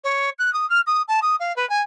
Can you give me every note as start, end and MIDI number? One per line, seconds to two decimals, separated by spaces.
0.04 0.30 73
0.39 0.53 90
0.53 0.68 87
0.70 0.81 89
0.87 1.02 87
1.08 1.20 81
1.22 1.36 87
1.40 1.55 77
1.56 1.68 71
1.70 1.82 80